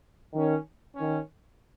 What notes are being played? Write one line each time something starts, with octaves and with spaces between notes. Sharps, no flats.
D#3 C#4
D#3 C#4